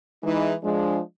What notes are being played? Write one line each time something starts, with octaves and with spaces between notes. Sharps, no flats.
E3 G#3 D#4
F3 G#3 D4